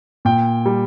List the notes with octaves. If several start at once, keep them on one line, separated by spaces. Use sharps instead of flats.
A#2 G5
G3